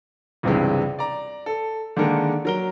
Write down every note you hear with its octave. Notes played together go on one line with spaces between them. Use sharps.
C#2 G2 C3 E3 G#3
D5 A#5
A4
D3 D#3 G#3 A#3 A4 A#4
F#3 A#4 G7